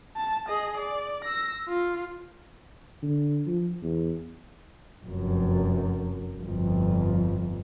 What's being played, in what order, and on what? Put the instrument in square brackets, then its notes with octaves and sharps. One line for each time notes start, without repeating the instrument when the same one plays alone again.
[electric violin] A5
G#4 D#5
D5
E6 A#6
F4
[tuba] D3
F3
E2
[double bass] F1 F#2
G1 F2